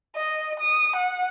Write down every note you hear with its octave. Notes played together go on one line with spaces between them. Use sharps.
D#5
D#6
F#5